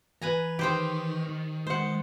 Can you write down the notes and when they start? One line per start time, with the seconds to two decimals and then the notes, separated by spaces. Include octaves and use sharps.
0.22 E3 B4 G#5 A#5
0.59 D#3 G4 C5 G5
1.67 G#3 C5 F#5